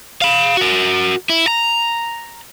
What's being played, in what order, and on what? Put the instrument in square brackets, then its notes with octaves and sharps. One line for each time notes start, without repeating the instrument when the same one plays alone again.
[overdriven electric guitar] F5 B5
F#4 A#4
E4
A#5